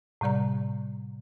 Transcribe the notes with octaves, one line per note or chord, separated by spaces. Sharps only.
A2 C3 G3 D5 A#5